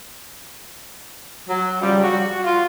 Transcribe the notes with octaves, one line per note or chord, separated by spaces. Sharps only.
F#3
C#3 F3 G3
F#4
F4